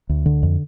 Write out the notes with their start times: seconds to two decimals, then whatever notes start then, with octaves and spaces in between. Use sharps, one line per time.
0.09 D2
0.26 D3
0.43 F2